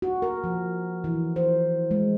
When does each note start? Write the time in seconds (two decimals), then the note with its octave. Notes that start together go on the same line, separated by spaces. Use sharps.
0.02 F#4
0.22 A#4
0.44 F3
1.04 E3
1.36 C5
1.91 G#3